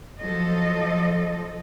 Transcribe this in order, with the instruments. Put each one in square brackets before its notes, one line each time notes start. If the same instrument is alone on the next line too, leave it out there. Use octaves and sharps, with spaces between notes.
[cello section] F3 F#3 A4 D#5